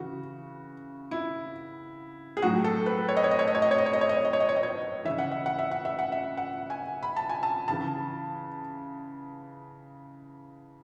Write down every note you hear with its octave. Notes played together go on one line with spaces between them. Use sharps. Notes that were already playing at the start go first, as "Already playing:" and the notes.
Already playing: C#3 E3 F#4
E4
G#4
A2 F#3 F#4
A4
B4
C#5
D#5
C#5
D#5
C#5
D#5
C#5
D#5
C#5
D#5
C#5
D#5
C#5
D#5
C#5
D#5
C#5
D#5
C#5
D#5
C#5
C#3 E3 E5
F#5
E5
F#5
E5
F#5
E5
F#5
E5
F#5
G#5
B5
A5
G#5
A5
C#3 E3 A5